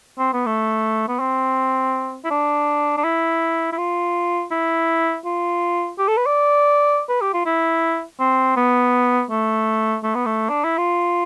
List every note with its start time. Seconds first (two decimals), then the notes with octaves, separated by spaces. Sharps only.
0.19 C4
0.33 B3
0.46 A3
1.08 B3
1.20 C4
2.24 E4
2.31 D4
2.97 D4
3.04 E4
3.72 E4
3.78 F4
4.51 E4
5.25 F4
5.99 G4
6.08 A4
6.17 B4
6.26 D5
7.09 B4
7.21 G4
7.34 F4
7.46 E4
8.20 C4
8.57 B3
9.30 A3
10.04 A3
10.15 B3
10.26 A3
10.49 D4
10.64 E4
10.78 F4